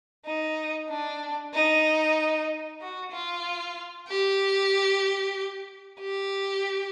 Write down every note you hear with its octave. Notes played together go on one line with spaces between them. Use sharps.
D#4
D4
D#4
F#4
F4
G4
G4